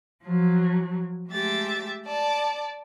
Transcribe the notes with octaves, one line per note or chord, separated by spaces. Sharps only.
F3 F#3
G#3 A3 G4 E5 A6
D5 A5